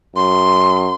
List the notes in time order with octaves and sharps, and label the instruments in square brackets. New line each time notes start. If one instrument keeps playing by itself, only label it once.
[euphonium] F#2 [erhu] C6